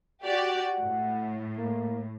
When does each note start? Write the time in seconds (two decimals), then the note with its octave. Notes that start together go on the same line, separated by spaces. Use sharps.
0.25 F#4 G4 D5 F#5
0.83 A2
1.58 A#3